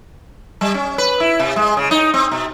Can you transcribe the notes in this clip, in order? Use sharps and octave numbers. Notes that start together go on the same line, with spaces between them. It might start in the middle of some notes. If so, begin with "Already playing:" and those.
G3
C#4
B4
E4
C3
G#3
C#3
D#4
C4
B2